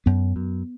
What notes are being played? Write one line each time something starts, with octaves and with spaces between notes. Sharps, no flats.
F#2 B3
F#2